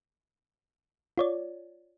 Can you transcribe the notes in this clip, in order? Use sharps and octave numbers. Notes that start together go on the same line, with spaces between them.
F4 C#5 D5